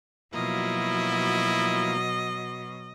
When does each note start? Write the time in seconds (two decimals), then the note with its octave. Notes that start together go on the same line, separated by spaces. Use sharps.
0.34 B2 F3 F#3 A#3 E4 D#5